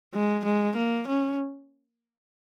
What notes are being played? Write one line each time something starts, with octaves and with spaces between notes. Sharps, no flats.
G#3
G#3
A#3
C#4